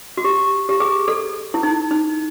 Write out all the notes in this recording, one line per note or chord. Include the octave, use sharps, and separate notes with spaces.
F#4
G4
G4
G#4
A4
E4
D#4
D#4